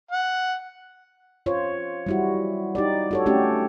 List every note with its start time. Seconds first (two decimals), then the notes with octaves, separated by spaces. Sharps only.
0.12 F#5
1.46 F4 C5 C#5
2.06 G3 E4 F#4
2.75 D#4 G4 D5
3.11 F#4 A4 C#5
3.26 A3 C#4 D4 F#4 G4